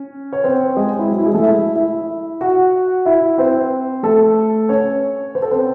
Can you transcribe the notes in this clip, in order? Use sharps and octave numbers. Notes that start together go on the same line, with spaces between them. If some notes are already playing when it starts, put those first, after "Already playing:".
Already playing: C#4
C#5
C4 C5
G#3 G#4
E4
F#3 F#4
E4
G#3 G#4
A3 A4
E4 E5
E4 E5
F#4 F#5
E4 E5
C4 C5
A3 A4
C#4 C#5
C5
A4
C4 C5